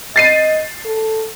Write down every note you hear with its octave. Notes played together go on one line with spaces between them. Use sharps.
D#5 A6 C7 D#7
A4